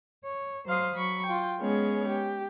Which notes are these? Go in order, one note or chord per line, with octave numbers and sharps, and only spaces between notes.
C#5
F#3 C5 F5 C6 D#6
F#3 B5 C#6
F4 G5
G#3 B3 C#4 G#4 C#5
G4